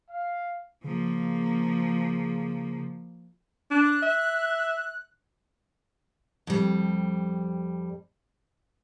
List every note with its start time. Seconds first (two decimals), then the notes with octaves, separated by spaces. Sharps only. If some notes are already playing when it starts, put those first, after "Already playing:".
0.11 F5
0.84 C#3 F3 A#3
3.71 D4 F#6
4.03 E5
6.47 F2 G3